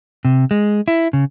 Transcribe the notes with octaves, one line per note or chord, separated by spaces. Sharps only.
C3
G#3
E4
C#3